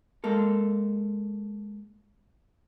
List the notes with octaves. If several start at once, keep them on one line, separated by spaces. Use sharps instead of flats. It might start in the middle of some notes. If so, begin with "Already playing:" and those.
G#3 A#3 A4